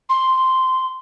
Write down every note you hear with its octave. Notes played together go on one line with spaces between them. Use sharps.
C6